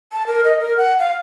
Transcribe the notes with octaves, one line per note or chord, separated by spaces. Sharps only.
A5
A#4
D#5
A#4
F#5
F5